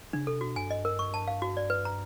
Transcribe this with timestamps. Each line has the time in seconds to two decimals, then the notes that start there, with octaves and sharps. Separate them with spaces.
0.13 C#3 D4
0.27 C3 A4
0.41 B2 F#4
0.56 G2 G#5
0.71 D#5
0.85 A#4
0.99 C#6
1.14 A5
1.28 F5
1.42 F#4
1.57 D5
1.70 B4
1.85 A#5